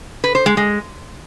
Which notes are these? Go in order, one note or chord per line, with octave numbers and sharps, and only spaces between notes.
B4
C5
G#3
G#3